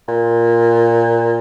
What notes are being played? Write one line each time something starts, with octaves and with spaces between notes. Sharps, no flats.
A#2